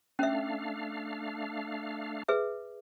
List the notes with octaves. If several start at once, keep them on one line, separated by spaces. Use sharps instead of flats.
A3 C#4 D4 E5 F5
G#4 B4 E5